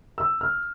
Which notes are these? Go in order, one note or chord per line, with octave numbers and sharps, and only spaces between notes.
E6
F6